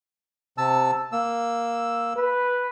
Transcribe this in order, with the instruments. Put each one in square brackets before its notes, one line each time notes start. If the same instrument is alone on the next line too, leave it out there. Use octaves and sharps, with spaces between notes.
[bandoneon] C3 A5 E6
A#3 E6
[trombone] B4